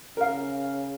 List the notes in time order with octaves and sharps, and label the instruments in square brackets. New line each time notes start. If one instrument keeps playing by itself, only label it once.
[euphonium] C#3 [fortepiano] A#4 F5